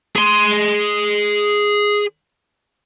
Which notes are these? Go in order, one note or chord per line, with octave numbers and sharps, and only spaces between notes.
G#4 C6